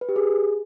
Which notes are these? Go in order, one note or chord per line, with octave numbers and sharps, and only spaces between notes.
B4
G4
G#4